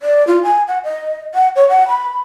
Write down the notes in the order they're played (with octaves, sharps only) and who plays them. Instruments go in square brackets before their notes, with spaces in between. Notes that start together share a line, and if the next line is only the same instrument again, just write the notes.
[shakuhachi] D5
F4
G#5
F#5
D#5
F#5
C#5
F#5
B5